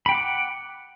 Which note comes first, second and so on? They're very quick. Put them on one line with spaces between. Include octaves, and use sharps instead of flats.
B5 G5 F#5 D6